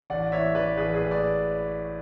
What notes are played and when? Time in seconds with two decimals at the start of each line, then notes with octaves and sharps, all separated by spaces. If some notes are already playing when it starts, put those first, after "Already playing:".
0.10 A1 D5 F#5
0.32 E3 C#5 E5
0.55 A1 B4 D5
0.77 A1 G#4 B4
0.94 G#4 B4
1.00 A2
1.11 D5